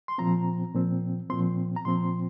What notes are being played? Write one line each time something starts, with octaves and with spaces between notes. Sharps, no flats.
C6
A#2 F3 C4 A#5
A#2 F3 C4
A#2 F3 C4 C6
A#5
A#2 F3 C4 C6